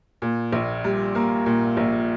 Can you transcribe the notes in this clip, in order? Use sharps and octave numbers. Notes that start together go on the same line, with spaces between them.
A#2
A#1
G3
A#3
A#2
A#1